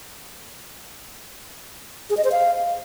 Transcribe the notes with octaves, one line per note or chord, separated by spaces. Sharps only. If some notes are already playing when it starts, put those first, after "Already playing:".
G#4
D#5
C5
F5